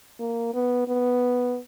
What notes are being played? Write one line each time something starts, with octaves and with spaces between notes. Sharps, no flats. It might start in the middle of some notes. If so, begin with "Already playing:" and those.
A#3
B3
B3